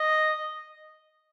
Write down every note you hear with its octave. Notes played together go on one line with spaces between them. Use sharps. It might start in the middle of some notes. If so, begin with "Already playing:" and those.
Already playing: D#5